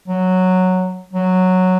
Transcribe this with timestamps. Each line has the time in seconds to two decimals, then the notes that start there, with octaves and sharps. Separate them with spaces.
0.08 F#3
1.13 F#3